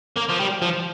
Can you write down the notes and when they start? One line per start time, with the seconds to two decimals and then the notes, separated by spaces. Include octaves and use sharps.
0.17 A#3
0.30 F3
0.40 G3
0.62 F3